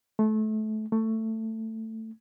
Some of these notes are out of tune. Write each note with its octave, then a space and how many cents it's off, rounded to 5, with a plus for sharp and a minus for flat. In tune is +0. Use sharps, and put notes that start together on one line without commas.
A3 -25
A3 +15